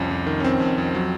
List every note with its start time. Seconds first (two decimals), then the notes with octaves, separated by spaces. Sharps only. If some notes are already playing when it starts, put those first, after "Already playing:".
Already playing: C2 F2 C#4
0.11 F2
0.27 D#3
0.40 C#4
0.43 F2 C4
0.60 F2
0.78 F2
0.95 F#3